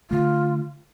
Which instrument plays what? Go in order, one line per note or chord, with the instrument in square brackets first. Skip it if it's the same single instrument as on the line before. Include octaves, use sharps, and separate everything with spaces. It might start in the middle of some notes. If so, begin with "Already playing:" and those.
[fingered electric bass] D3 A3 [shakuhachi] F4